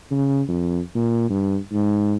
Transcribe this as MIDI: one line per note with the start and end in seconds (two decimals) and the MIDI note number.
0.11 0.41 49
0.48 0.79 41
0.95 1.26 46
1.30 1.57 43
1.73 2.16 44